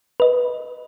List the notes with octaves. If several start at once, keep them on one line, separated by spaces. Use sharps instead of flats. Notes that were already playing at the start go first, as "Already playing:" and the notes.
B4 D#5